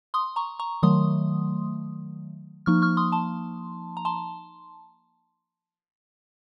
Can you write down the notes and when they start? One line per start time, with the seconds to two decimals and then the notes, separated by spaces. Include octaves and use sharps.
0.14 C6 D#6
0.36 A#5 C#6
0.60 A#5 C#6
0.83 D#3 F#3 A3 C6 D#6
2.66 F3 A#3 D#4 C#6 F6
2.82 C#6 F6
2.97 C6 D#6
3.12 A5 C6
3.97 A#5
4.05 A5 C6